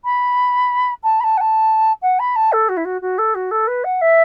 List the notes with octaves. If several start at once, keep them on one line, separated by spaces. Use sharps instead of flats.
B5
A5
B5
A5
F#5
A5
F#5
B5
A5
A4
F#4
E4
F#4
F#4
A4
F#4
A4
B4
F#5
E5